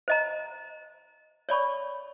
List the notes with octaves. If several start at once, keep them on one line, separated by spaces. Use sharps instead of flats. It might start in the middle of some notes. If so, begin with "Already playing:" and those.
C5 D#5 A#5
C#5 D5 B5 C#6